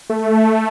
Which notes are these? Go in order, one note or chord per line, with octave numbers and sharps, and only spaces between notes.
A3